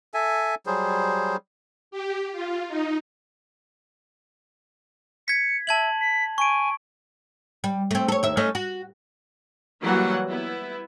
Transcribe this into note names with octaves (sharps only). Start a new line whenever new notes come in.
A4 E5 G#5
F#3 G3 G#4 C5
G4
F4
D#4
G#6 B6 C#7
E5 A5 G#6 F#7
B6
G#5 C#6 D7
G3
A3 C4
A4 C#5
D#2 E5
A3 C#4 D#4
F#4
E3 F#3 G3 A#3 F#4 F#5
B3 E4